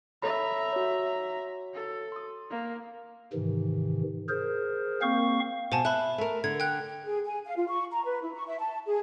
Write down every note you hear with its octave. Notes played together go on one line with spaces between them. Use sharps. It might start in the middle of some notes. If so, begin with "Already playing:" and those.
A4 C#5 E5 A#5 B5
F#4 C#5
A4
C6 D#6
A#3
G#2 C3 D#3 E3
G#4 A#4 C5
A#3 C4 F5 C#6
B2 C5 G#5 A5
E5 B5 F#6
A3 A#4
D3 G#6
G5 F#6
G#4
G#5
F5
F4
C#6
A#5
B4
E4
C#6
E5
A5
G#4